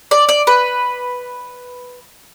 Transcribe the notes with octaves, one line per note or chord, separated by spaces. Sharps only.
D5
D5
B4